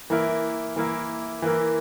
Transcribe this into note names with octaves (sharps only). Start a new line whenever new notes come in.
E3 A#3 E4 A#4
E3 A#3 E4 A#4
E3 A#3 E4 A#4